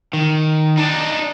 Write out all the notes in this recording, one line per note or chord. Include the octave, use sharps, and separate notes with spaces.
D#3
D4 D#4